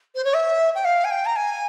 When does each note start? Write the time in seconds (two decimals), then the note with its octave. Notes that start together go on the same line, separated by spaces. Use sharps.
0.15 C5
0.24 C#5
0.33 E5
0.74 G5
0.84 F5
1.04 G#5
1.10 G5
1.25 A#5
1.35 G#5